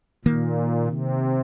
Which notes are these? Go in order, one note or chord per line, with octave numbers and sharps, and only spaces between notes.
A#2 D#3 A#3
C3